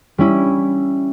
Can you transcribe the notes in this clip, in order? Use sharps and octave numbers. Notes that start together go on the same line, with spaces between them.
G3 C#4 E4